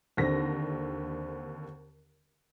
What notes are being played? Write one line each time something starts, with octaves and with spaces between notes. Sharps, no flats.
D#2 D3 C4 A#6